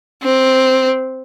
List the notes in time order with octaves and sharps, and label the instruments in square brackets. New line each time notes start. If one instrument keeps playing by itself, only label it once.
[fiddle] C4